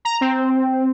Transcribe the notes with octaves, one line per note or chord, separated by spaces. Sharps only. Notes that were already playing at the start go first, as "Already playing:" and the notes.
A#5
C4